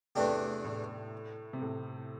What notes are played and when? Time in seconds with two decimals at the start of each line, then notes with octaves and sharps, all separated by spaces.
0.15 E2 C3 E3 A3 D4 G4
0.64 A2
1.53 C3
1.62 A2